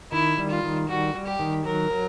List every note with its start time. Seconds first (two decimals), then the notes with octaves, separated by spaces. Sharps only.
0.12 D#3 E4
0.38 G3
0.50 F4
0.63 D#3
0.89 G3 F#4
1.14 G3
1.27 G4
1.39 D#3
1.65 F#3 A#4
1.90 F#3